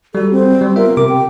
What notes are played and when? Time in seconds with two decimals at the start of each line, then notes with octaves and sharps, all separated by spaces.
0.15 G3 F#4 A4
0.31 C4
0.61 G3
0.76 B3 F4 A#4 E5
0.97 C3 A#4 D6
1.09 G5